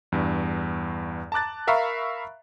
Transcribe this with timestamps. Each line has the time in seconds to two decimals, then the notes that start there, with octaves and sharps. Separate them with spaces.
0.12 E2 G2
1.32 A5 A#5 D6 F#6 A6
1.67 A#4 E5 F5 A#5 B5 C#6